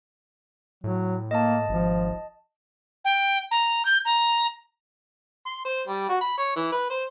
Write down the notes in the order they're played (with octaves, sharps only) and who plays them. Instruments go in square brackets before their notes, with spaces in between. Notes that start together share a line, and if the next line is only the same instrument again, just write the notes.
[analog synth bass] A2 [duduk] F#3
[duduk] A#3 [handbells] D#5 A5
[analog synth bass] G#1 [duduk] F3
[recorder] G5
A#5
G6
A#5
[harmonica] C6
C5
G3
F#4
B5
C#5
E3
B4
C5